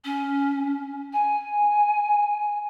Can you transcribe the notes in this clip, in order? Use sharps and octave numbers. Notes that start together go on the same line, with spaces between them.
C#4
G#5